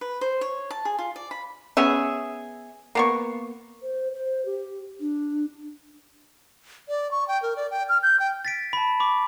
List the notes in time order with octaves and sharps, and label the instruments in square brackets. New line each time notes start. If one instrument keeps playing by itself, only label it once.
[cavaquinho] B4
C5
C#5
A5
G#4
F4
D5
B5
[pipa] B3 C#4 G#4 E5
A#3 B3 C#6
[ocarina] C5
C5
G4
D4
[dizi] D5
C#6
G5
A#4
D5
G5
F6
G6
G5
[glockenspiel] A6 B6 D7
A5 B5
B5 C#6 D6